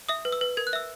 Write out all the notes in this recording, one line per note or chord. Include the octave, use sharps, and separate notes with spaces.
E5 D#6
B4
E6
B4
A#4 G#6
F#6
E5 E6